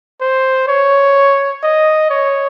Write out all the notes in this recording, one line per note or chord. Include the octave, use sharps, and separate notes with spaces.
C5
C#5
D#5
C#5